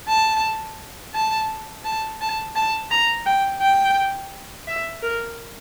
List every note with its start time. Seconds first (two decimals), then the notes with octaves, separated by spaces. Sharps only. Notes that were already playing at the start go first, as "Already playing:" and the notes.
0.09 A5
1.14 A5
1.85 A5
2.21 A5
2.55 A5
2.91 A#5
3.26 G5
3.62 G5
4.68 E5
5.02 A#4